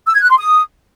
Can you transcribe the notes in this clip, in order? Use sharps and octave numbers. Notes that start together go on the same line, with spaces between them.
E6
G#6
F#6
C6
D#6